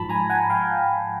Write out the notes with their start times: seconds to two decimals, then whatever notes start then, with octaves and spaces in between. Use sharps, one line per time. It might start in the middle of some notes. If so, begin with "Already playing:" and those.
Already playing: G#2 F3 A5 B5
0.09 G#5 A#5
0.30 F#5 G#5
0.50 F5 G5